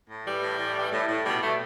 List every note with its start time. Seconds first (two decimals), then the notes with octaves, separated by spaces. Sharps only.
0.09 A2
0.26 E3 G3
0.42 A2
0.59 A2
0.76 E3
0.92 A2
1.09 A2
1.26 B2 G3
1.42 B2 A3